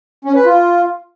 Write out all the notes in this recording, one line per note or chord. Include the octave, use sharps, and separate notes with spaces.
C#4
B4
F4